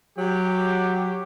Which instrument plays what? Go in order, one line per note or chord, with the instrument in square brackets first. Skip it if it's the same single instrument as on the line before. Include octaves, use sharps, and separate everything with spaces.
[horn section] F#3 G4